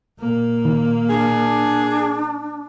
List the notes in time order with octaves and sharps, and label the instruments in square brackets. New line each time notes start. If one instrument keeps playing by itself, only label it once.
[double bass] A#2 A#3
[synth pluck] D#3
[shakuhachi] D4 [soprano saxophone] G#4